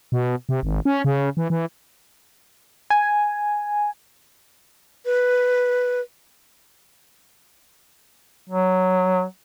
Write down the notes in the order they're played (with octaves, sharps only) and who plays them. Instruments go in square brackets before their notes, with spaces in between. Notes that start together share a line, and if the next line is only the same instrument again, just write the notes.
[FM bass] B2
C3
G#1
C#4
C#3
E3
E3
[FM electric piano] G#5
[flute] B4
[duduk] F#3